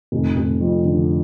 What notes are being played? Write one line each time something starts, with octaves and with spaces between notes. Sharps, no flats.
F1
F1
F2
D3